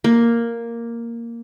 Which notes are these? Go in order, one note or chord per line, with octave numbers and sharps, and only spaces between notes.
A#3